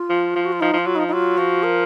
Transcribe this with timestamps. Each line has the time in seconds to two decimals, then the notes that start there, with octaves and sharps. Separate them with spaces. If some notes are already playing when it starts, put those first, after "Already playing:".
Already playing: F4
0.10 F3
0.35 F3
0.44 F#4
0.52 F4
0.61 F3 D#4
0.73 F3 F4
0.87 F#3
0.95 D#4
0.99 F3
1.08 D#4
1.13 F#3 F4
1.38 F3 F#4
1.63 A#4